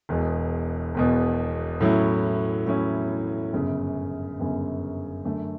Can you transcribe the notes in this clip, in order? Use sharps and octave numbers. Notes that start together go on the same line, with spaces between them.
E1 E2 B2
E1 E2 B2
A2 F#3 C#4 E4
A2 F#3 C#4 E4
G1 F#2 C#3
G1 F#2 C#3
F#2 D3 A3